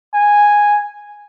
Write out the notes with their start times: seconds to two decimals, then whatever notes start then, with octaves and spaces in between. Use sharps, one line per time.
0.14 G#5